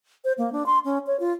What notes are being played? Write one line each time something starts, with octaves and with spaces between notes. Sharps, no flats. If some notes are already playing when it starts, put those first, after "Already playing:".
C5
A#3
D4
C6
C#4
C#5
F4